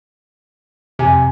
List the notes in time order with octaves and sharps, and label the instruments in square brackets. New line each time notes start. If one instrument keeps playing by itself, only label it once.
[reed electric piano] F2 G#5 [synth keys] C3